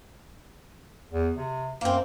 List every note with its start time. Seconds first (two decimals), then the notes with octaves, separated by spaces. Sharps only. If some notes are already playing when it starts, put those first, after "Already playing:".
1.10 E2
1.37 C3
1.81 F#2 A#3 C4